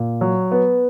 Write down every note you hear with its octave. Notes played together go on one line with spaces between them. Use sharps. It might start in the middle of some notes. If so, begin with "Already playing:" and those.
Already playing: A#2
F#3
B3